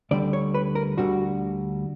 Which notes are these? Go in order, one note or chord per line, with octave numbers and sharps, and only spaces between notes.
D2 D3 G3 D5
C#5
B4
A#4
D2 D3 G3 F#4